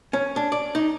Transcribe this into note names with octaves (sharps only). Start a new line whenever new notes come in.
C#4
D4
D5
D#4